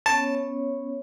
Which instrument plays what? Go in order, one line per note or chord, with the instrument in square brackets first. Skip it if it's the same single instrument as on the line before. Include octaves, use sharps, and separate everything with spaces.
[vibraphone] B3 C#4 C#5 [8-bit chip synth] A5